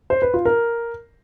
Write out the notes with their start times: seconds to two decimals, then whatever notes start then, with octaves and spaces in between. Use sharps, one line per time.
0.10 C5
0.22 B4
0.34 F4
0.45 A#4